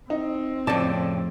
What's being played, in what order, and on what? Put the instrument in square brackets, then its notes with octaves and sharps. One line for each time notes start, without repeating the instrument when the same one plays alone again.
[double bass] C4 [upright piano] D#4
[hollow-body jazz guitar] F2 A5 [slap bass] A2 C#3 [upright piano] D5